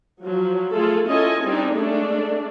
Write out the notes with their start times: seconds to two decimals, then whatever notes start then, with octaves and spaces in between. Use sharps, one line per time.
0.24 F3 F#3
0.73 A3 F4 G#4 A4
1.07 C#4 E4 F4 A4 D#5 G#5
1.44 G3 C4 D4 D#4 G4
1.76 G#3 A3 C#4 D4